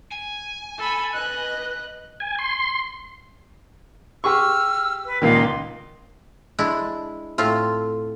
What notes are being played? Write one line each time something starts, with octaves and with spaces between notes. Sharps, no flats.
G#5
A4 B5
B4 D#5 F#6
G#5
C6
G4 G#4 C#6 E6 F6
B4
C#2 A#2 D#3 D#4 F5 C6
G#3 D4 E4
A2 A3 C4 F4